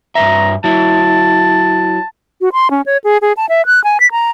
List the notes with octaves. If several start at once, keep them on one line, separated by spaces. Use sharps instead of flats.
G2 B4 E5 A#5
F#3 E4 A5
F#4
C6
C#4
C#5
G#4
G#4
A5
E5
F#6
G#5
B6
A#5